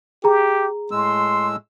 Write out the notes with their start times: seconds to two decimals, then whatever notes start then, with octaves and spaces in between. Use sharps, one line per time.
0.24 G4 G#4 A#5
0.91 A2 G#3 C6 E6